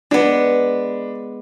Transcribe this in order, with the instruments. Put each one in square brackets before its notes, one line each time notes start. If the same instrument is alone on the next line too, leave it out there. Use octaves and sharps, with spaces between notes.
[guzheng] G#3 B3 [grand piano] D4